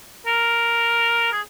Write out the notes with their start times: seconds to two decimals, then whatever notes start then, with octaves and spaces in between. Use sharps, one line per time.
0.26 A#4
1.32 G#4